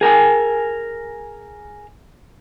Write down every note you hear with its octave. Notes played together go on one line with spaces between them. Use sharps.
G#4 A#4 G5 G#5